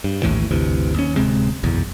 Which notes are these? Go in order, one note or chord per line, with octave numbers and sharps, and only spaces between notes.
G2
A#1 D#2 A2 E3
G1 D2 C3 E3
D#2 C#4
D1 C3 G#3 C4
F#1 B1 E2